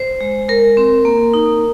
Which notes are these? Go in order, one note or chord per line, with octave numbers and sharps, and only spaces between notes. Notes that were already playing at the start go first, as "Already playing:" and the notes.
Already playing: C5
G#3
G#3 A#4
C4
A#3
D#4